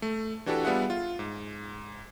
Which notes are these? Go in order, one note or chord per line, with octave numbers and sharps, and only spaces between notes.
A3
E3 D4 F#4 G4 A4 B4
G3 B3 F4 G#4 E5 F#5
F4
G#2